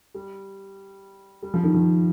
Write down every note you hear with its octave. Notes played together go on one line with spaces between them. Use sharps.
G3
G3
F3
D#3
F3